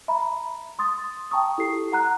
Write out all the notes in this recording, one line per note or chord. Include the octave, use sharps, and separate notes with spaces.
E5 A#5 B5
C6 D#6 A6
G5 A5 A#5 C#6 D#6
E4 G4 A4 C7
F#5 A#5 F#6